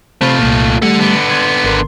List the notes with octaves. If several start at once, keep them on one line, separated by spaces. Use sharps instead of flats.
C3 A3 F4 C5 B5
C2 A#2
G3 A3 A4 F#5
D3 B3
C6 G#6
G#1 A#4 C6